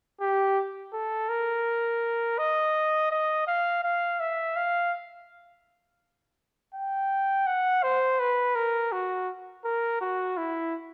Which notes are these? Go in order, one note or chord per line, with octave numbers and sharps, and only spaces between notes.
G4
A4
A#4
D#5
D#5
F5
F5
E5
F5
G5
F#5
C5
B4
A#4
F#4
A#4
F#4
E4